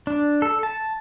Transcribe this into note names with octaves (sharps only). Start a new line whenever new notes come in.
D4
A4
A5